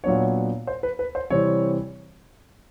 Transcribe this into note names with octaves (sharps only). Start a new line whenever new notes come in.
A#2 F#3 B3 D4 C#5
C5
B4
B4
C5
C3 E3 G3 C4 C#5